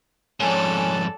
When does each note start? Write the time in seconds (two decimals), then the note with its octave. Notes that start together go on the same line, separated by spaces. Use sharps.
0.40 F2 G#2 C#4 A4 C#5 D5 G#5 F#6